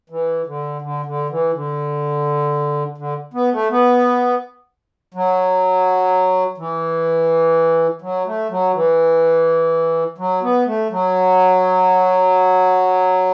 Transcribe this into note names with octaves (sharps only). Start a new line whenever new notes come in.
E3
D3
D3
D3
E3
D3
D3
B3
A3
B3
F#3
E3
F#3
A3
F#3
E3
F#3
B3
A3
F#3